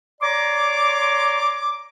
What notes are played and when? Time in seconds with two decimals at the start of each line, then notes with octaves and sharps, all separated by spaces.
0.21 C#5 D5 A#5 C6 D6